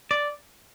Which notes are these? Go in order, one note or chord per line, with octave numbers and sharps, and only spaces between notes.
D5